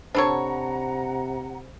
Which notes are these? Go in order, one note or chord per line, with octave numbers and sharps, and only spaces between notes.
C3 D4 A4 C5 C#5 F#5 A#5 B5